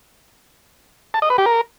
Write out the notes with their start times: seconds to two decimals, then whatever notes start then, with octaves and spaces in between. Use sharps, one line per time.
1.14 A5
1.22 D#5
1.30 B4
1.38 G4
1.46 A#4